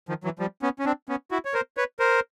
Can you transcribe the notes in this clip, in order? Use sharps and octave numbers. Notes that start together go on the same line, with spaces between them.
D#3 F3
E3 F#3
F3 G3
B3 C#4
C#4
C4 D4
B3 C#4
E4 F#4
C#5
A#4 C5
B4 C#5
A#4 C5